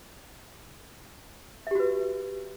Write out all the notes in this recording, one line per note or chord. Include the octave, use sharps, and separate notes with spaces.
F#4 G4 B4 E5